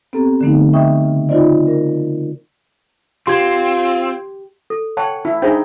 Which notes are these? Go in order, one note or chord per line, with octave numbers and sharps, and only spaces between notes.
B3 C4 G4 A4 A#5
D3 F3 A3 B3 D#4
D#5 E5 G5 C#6 D#6
C#3
D#4 F4 F#4 C5 D5 D#5
A#4
C4 F4 G4 C6 G#6
A4
C#5 F#5 G5 A5
E4
D4 D#4 G#4 C5 G5